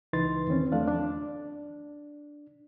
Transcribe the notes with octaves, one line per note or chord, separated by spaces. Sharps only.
C#2 E3 D#4 B4 C6 A6
E2 D#3 C4 C#4
E2 F3 A3 D4 D5 F5
D4